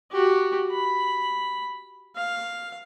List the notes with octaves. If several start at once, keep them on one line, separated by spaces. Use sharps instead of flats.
F#4 G4
B5
F5